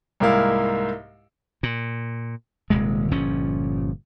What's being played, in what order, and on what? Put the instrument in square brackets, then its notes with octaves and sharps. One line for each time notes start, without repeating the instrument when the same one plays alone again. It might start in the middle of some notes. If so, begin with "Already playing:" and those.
[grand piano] C2 G#2 A#3 E4 F5
[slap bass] A#2
D#1 D#2 C3 G#3
G1 A#2 F3 C#4